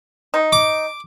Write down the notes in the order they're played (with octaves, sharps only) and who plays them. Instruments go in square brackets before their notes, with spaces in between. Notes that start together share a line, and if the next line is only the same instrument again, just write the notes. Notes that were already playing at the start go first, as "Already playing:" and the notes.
[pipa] D#4
[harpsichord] D6